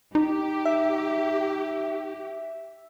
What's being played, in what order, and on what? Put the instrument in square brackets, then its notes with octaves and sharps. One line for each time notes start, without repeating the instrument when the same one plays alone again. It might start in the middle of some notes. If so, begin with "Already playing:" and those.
[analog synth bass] D#4 [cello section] G4
[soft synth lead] E5